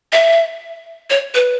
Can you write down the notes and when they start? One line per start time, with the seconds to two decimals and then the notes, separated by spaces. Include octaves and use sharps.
0.12 E5
1.10 C#5
1.34 B4